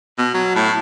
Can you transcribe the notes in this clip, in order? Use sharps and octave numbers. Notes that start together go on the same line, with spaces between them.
B2
F#3
A2